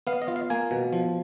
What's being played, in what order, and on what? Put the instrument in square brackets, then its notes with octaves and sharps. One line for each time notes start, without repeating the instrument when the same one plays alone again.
[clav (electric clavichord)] B3 F5
D#5
F4
F5
A#3 G#5
B2
F3